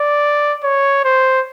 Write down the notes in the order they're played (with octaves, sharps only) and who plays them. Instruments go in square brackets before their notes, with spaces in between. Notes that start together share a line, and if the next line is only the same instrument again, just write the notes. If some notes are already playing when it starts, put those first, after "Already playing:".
Already playing: [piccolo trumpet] D5
C#5
C5